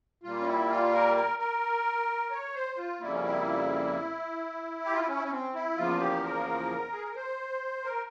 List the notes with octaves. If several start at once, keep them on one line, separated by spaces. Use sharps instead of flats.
A#2 G3 A#3 F4
C#4
E4
F4
A#4
A#4
A#4
C#5
C5
F4
F2 C#3 G3 A#3 E4
C#4
E4
G4
F4
E4
C#4
E4
C#4
C4
E4
E2 C#3 F3 A#3 F4
G4
A#4
G#4
A#4
C5
A#4